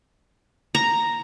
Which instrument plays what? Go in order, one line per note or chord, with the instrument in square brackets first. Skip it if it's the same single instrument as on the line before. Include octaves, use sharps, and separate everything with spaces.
[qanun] A#5